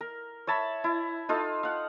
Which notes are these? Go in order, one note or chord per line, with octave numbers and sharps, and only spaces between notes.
A#4
C#5 E5 A5 B5
E4
D#4 F4 A4
F5 F#5